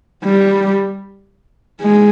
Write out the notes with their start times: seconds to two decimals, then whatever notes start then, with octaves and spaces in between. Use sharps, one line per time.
0.24 G3
1.82 G#3